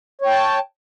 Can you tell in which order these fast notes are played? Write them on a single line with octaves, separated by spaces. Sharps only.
C#5 G5 A5